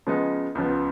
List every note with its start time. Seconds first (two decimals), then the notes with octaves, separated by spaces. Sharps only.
0.06 C#3 F3 G#3 B3 D#4
0.55 C#2 C#3 F3 B3